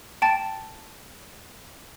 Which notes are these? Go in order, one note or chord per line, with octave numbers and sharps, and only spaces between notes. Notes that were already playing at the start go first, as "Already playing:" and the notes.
G5 A5 A6